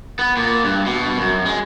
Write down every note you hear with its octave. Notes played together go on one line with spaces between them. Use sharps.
B3
A#2
G2
B2
F#2
G#3